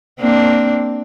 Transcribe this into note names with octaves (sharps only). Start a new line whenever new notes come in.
A#3 C4 D4